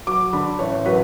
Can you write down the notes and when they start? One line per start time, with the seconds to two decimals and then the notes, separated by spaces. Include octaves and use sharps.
0.07 F#3 D6
0.33 D3 B5
0.59 A1 C#5
0.85 F#3 B4